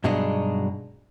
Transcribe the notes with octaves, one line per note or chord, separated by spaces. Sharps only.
G2 B2 F#3 G#3 D4 D#4